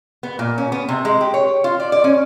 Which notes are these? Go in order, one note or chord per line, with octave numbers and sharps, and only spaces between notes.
B3
A#2
C#4
B3
C3
G#3
G4
C#5
F4
D5
D5
C#4